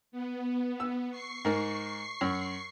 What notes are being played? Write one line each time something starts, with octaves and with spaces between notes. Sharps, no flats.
B3
E6
C#6 C7
G#2 A#4
F#2